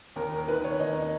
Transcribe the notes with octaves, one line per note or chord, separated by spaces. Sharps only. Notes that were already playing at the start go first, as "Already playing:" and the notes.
D#2 A#4
A#4
D#3 B4
C#5
D#2 D#4